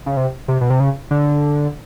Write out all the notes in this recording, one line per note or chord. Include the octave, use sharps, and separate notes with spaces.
C#3
C3
C3
B2
C3
C#3
D3